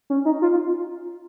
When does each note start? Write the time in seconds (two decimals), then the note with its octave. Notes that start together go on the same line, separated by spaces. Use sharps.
0.10 C#4
0.25 D#4
0.42 F4